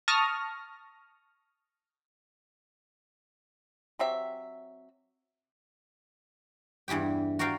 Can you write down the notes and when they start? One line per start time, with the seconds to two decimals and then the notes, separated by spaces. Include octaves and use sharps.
0.08 A5 C#6 D#6 F6 A#6
3.99 F#3 C4 G4 E5
6.88 E2 G2 E3 G4 G5
7.39 F#4 A#4 D5 F5 G5